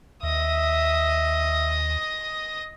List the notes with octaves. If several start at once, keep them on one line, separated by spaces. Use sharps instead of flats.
D#2 D#5 E5 D#6